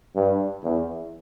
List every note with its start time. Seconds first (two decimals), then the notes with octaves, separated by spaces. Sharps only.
0.15 G2
0.63 E2